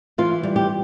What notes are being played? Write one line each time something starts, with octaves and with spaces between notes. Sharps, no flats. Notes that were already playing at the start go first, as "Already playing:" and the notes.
E3 F4
G3
G4